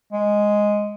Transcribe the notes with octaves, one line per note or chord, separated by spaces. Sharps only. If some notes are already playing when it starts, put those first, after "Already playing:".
G#3